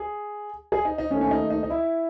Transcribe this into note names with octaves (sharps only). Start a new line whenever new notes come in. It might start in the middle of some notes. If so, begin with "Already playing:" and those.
Already playing: G#4
G#4
D#4
D#4
D#2 D#3 A3 C#4
C#4
D#4
D#4
D#4
E4